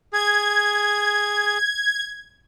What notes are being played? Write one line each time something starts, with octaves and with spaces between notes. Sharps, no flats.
G#4 G#6